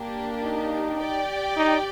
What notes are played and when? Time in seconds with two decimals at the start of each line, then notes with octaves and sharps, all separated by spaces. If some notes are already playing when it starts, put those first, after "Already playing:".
Already playing: A#3 D4 G4
0.44 D#4
1.00 G4 D5 G5
1.57 D#4